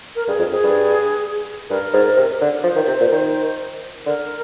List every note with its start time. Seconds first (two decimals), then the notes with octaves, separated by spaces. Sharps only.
0.16 A#4
0.28 G2 G#4
0.39 F2
0.51 F2 G#4
0.63 G2
1.70 G2 A#4
1.94 G#2
2.17 C3
2.41 D3
2.64 F3 C5
2.76 D#3
2.87 C3
3.00 A#2
3.12 D#3
4.06 D3 A#4